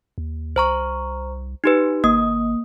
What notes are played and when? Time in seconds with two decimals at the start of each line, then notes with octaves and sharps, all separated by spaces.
0.18 D#2
0.56 C2 C5 A#5 C#6
1.64 D#4 G4 B4
2.04 G#1 A#3 D#6